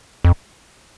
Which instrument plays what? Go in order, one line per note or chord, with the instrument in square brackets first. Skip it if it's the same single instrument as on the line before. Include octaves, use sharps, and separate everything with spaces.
[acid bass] F2